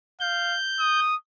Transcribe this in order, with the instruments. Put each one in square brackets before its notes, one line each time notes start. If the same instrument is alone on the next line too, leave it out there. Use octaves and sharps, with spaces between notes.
[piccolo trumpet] F5 [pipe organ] G6
[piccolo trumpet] D#6